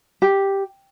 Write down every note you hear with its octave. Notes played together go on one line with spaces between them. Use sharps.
G4